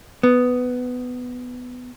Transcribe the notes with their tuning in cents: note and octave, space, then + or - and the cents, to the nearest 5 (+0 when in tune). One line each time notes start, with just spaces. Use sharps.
B3 +10